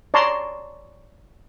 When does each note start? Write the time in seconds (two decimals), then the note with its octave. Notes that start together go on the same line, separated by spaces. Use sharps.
0.14 C#5 D5 A5 A#5 C6